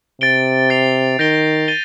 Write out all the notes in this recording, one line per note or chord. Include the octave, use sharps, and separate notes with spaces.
C3 A6 D7 G7
A6 C7 F7
D#3 G6 A#6 D7 G7
A6 D#7 G7